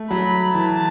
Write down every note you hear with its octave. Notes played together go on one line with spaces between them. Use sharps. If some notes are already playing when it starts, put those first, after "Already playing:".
Already playing: A3
F#3 B5
E3 A5